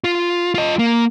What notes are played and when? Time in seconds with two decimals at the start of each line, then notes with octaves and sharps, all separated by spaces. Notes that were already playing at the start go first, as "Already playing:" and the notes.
0.04 F4
0.54 F4 D#5
0.79 A#3